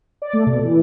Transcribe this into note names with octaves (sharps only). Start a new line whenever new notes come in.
D5
A3
B2
E3